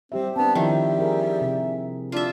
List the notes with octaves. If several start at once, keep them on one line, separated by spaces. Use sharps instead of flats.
G3 C4 G4 E5
B3 C4 D4 A5
D#3 F3 G3 E4 E5
G#4 A#4
C3
D4 F4 E5